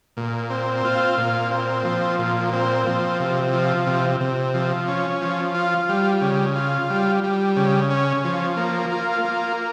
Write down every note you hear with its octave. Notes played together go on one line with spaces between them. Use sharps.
A#2
C4
F4
A#2
C4
F3
A#2
C4
F3
C3
F3
C3
C3
F3
C#4
F3
F4
G3
C#3
F4
G3
G3
C#3
C#4
F3
A#3
F4
A#3